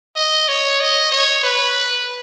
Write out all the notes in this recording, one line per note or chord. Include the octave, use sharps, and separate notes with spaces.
D#5
C#5
D#5
C#5
B4